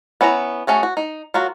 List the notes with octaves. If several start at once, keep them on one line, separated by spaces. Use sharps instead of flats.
B3 C#4 E4 D5 A#5
A3 C#4 F#4 G#4
F#4
D#4
F#3 F4 F#4 A#4